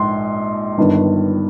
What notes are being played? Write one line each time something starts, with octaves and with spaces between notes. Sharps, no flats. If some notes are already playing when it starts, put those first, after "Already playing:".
Already playing: A#1 G#2 C6
G1 G2 D#3